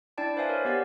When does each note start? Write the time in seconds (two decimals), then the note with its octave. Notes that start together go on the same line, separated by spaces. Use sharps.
0.18 D4 E4 D5 G5 A5
0.36 B4 C5 D5 E5 F5 G#5
0.49 A#4 C#5
0.65 B3 G4 D5 F#5